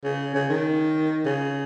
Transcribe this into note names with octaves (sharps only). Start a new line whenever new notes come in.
C#3
C#3
D#3
C#3